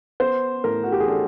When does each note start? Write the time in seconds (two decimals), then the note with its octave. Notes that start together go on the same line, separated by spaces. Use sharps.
0.20 B3 C5
0.64 A2 A#4
0.84 F#4
0.92 G4
1.00 G#4
1.08 D4 A4